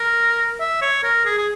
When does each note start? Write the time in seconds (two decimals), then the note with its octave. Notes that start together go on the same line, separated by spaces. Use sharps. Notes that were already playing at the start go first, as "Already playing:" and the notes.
Already playing: A#4
0.60 E5
0.82 C#5
1.03 A#4
1.25 G#4
1.38 G#4